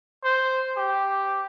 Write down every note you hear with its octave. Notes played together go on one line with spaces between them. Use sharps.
C5
G4